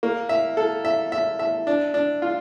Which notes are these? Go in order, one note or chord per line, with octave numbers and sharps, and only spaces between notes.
A#3
E5
A4
E5
E5
E5
D4
D4
F4